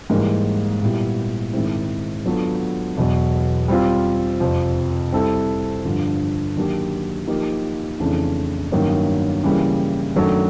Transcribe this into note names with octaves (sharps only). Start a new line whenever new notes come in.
G#2 E3 G3 A#3
A#2 G3 B3 E4 G4
G#2 D#3 G#3 C4 E4
F#3 B3 D4 F4 A4
E2 B2 F#3
G3 C4 F4
F2 C3 F3
G3 C4 E4 A4
G2 D3 F3
D#3 F#3 A#3 D4 G4
F3 A#3 D#4 G4
F2 C#3 E3 A3 D4
G2 D#3 F#3 A#3 C#4
C#3 E3 G3 A#3
F#2 D#3 F#3 A3 D4